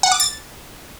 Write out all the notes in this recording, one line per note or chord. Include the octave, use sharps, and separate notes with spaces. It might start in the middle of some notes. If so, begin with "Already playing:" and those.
F#5
D6
A6